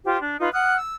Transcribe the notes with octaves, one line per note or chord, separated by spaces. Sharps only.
F4 G4 C5
D4
D#4 F4 B4
F#5 D#6 F6 F#6
E6